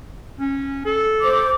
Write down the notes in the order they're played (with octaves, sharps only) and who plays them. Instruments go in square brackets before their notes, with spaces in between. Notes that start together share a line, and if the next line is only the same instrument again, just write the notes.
[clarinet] C#4
A4
[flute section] C5 D6